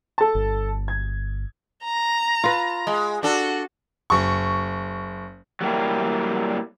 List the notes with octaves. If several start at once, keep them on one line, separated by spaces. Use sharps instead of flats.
A4 A5
G1
G#6
A#5
F4 B4
G#3
D4 F#4 A4
F#1 C#6
F#3 G3 A#3 E4